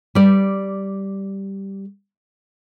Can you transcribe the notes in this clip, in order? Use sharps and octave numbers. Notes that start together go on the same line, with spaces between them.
G3 D5